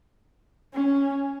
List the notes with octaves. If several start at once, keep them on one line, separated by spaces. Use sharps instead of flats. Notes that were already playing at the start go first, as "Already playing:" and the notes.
C#4